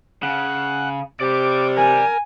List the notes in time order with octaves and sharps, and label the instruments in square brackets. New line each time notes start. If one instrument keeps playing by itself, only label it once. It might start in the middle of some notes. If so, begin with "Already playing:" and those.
[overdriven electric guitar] C#3 [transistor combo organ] F#5
[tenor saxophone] C3 [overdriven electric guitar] D5 G5 [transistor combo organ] D6
[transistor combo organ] A#4 [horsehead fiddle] G#5